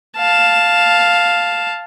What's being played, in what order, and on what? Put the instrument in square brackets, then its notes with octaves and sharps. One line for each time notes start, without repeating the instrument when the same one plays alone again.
[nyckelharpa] F5 A5